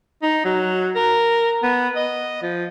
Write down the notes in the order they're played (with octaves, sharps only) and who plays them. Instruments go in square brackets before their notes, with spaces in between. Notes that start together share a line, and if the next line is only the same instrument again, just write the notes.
[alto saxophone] D#4
F#3
A#4
B3
D#5
F3